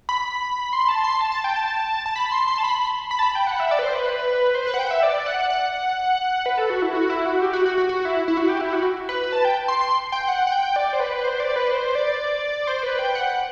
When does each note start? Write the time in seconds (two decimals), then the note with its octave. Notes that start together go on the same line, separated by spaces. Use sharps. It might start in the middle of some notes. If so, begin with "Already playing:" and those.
0.09 B5
0.73 C6
0.88 A5
1.04 C6
1.21 A5
1.32 A5
1.44 G5
1.56 A5
2.06 A5
2.16 B5
2.31 C6
2.48 C6
2.58 A5
2.63 B5
3.11 B5
3.19 A5
3.23 B5
3.35 G5
3.47 F#5
3.60 E5
3.71 D5
3.79 B4
3.83 C5
3.95 B4
4.55 C5
4.67 B4
4.74 F#5
4.79 G5
4.87 F#5
4.91 E5
5.03 D5
5.26 F#5
5.50 F#5
6.46 B4
6.58 A4
6.70 F#4
6.82 E4
6.94 F#4
7.10 E4
7.26 F#4
7.42 G4
7.53 F#4
7.65 F#4
7.78 F#4
7.89 F#4
8.05 E4
8.28 E4
8.37 F#4
8.49 G4
8.61 E4
8.73 F#4
9.09 B4
9.33 A5
9.45 G5
9.68 C6
9.81 C6
10.12 G5
10.28 F#5
10.47 F#5
10.52 G5
10.76 D5
10.93 C5
11.00 B4
11.24 C5
11.40 D5
11.56 B4
11.72 C5
11.95 D5
12.67 C5
12.83 B4
12.99 G5
13.15 F#5